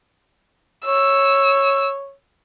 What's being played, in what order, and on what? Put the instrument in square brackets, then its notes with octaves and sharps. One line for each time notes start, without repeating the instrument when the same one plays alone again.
[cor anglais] C#5 [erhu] E6